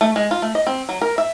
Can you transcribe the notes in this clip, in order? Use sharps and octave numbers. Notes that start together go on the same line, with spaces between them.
A3
G#3
F4
A3
D#5
C4
F#3
A#4
E5